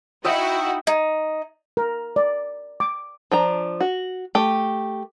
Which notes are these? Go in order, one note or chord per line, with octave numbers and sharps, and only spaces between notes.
D#4 E4 F#4 D#5 E5 G5
D#4
A#4
D5
D6
F3 D4 A#5
F#4
A3 G4